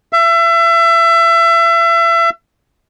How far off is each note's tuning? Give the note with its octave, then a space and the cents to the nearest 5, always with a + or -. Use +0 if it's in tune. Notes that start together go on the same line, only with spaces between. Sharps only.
E5 +30